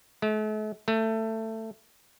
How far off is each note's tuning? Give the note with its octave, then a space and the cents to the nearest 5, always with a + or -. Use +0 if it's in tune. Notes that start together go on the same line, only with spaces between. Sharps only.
A3 -45
A3 +15